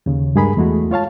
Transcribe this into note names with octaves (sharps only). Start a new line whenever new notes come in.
D#2 C#3
G2 G#3 G#4 A#4 B5
E2 G#3 A3 F#4
F4 C#5 F5 A5